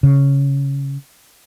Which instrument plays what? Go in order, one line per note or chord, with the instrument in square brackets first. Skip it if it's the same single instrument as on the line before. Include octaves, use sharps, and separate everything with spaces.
[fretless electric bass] C#3